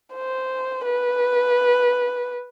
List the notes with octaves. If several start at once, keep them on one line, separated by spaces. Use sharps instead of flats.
C5
B4